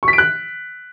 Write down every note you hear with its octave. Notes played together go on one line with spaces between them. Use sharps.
C#6
B6
D7
F#6